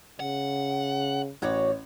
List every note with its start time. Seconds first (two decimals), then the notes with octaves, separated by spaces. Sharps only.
0.20 C#3 F#5
1.42 A1 F#4 C#5 D5 G#6